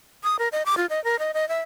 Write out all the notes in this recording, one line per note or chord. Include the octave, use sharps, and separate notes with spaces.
D#6
A#4
D#5
D6
F4
D#5
A#4
D#5
D#5
E5